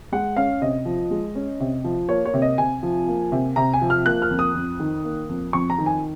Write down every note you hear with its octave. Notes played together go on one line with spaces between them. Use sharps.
G#3 F#5
C#4 F5
C3 D#5
F3
G#3
C#4
C3
F3
A#3 C#5
C#5
C3
D#5
C3 G#5
F3
A#3
C3
C3 A#5
G#5
F3
F6
A#3 F#6
F6
F2
D#6
F2
D#3
A#3
F2
F2 C#6
A#5
D#3
G#5